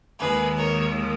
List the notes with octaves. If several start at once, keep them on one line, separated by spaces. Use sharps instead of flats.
D#2 D#3 G#3 G#4 B4
A#4 C#5